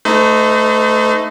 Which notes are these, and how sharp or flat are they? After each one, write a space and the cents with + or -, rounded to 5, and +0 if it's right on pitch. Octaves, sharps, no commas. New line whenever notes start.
A3 +0 D#4 +0 C5 -45